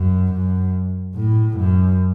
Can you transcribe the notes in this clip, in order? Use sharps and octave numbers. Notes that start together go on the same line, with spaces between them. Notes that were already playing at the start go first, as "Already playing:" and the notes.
Already playing: F#2
F#2
A2
F#2